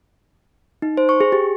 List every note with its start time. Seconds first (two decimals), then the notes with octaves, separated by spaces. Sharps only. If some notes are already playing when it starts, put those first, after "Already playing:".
0.82 D#4
0.97 C5
1.09 C#6
1.20 G#4
1.32 G4